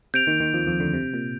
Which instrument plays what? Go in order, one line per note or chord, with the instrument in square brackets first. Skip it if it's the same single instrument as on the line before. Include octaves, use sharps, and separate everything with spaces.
[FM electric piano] C3 [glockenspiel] G6 D7 F7
[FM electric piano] D#2 D#3
D#2 D#3
F2 F3
F2 F3
D2 D3
C3
A#2